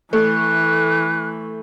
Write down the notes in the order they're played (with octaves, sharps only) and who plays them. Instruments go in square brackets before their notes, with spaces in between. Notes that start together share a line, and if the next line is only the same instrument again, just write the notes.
[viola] E3 [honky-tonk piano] A3 [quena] F#6